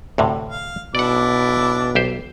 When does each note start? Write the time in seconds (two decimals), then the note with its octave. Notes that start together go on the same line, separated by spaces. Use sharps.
0.18 D2 A2 C3
0.49 F5
0.95 B2 D4 E4 D5 F#5 D6
1.95 B1 G4 C5